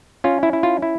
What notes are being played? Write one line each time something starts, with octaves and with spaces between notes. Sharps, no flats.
C#4 F4
E4
E4
F4
E4